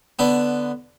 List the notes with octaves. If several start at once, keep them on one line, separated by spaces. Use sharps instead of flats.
D3 B3